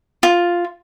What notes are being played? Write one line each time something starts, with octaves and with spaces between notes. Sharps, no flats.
F4